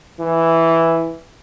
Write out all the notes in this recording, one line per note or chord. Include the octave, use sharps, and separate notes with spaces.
E3